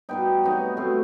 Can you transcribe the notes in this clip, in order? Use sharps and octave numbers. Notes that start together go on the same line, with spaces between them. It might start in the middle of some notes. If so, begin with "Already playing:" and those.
B2 G3 B3 D#4 G5
C3 F#3 B3 D#4
B2 A3 C4